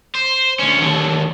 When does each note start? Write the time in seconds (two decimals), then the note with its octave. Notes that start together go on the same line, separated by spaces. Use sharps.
0.15 C5
0.59 D2 C#4
0.81 D#2 D3